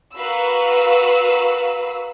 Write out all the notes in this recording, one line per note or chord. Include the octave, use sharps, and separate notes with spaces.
F#4 A#4 B4 F5 B5 E6